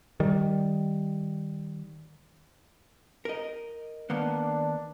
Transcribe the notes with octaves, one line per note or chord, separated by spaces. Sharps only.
D#3 G3
A#4 D#5
D#3 A#3 B3 D4